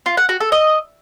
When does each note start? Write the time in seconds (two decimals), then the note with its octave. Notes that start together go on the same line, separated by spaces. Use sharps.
0.06 F4
0.17 F#5
0.29 F#4
0.40 A4
0.52 D#5